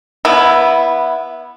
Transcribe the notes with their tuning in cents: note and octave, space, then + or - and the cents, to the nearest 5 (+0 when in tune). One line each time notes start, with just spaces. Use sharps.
B3 -15 E4 +0